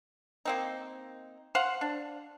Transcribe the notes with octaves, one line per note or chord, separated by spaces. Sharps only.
A#3 C4 D#4
C5 F5 F#5
D4